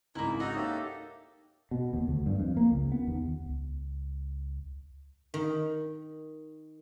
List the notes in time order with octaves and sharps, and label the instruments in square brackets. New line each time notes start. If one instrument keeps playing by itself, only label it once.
[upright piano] G#1 C#2 [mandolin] A#3 E4 [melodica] D#4
[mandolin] D#4 [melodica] F#4 A4 D#5
[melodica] A#3 G4 A4 [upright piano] C#5 E5
[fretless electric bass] B2
D#2
D2
G2
F2
A#3
C#2
B3
D#2
[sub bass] C#2
[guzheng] D#3